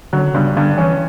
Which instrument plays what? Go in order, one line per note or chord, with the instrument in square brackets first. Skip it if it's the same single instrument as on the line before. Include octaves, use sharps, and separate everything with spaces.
[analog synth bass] D3 [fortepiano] F#3
[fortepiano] G2 [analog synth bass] C#3
[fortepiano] G2 [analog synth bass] D3
[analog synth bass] E3 [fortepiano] C#4